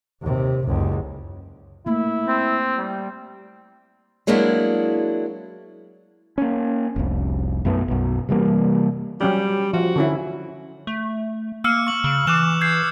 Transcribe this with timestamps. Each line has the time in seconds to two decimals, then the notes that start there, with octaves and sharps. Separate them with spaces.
0.21 D#2 C3
0.64 F#1 C#2
1.86 A3 A#3 E4
2.28 C4
2.77 G3
4.27 F#3 G#3 A#3 D4 E4 F#4
6.38 A#3 C#4
6.96 F1 C2
7.65 B1 F#2 A3 B3
7.88 B1 F#2
8.29 C3 E3 G3 A#3
9.21 F#3 G3 C#4 G4
9.73 F3 F#4
9.96 D3 C#4 E4
10.87 A3
11.64 A#3 E6 F6 C#7
11.87 C#6 F#7
12.04 C#3
12.27 E3 D6 F#6 E7
12.61 G6 G#6 C7